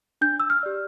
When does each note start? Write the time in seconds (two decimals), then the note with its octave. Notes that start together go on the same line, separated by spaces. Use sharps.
0.21 D4 G6
0.40 E6
0.50 F6
0.63 G4 D5